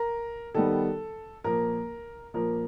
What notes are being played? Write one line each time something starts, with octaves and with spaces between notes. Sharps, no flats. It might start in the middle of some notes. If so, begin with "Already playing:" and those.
Already playing: A#4
D#3 G3 B3 A4
A#2 F3 A#3 A#4
A#2 F3 A#3 A#4